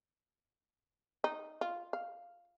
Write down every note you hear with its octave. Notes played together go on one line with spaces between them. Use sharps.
D#4
F4
F5